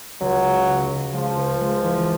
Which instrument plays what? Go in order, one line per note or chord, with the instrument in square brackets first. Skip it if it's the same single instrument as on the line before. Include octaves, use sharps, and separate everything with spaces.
[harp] C#2 [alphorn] F#3
[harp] G#3
C#3
C#2
[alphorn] F3 [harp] G#3
[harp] C#2
G#3
E3